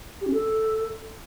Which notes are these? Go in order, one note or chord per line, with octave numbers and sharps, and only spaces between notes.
G4
C#4
A4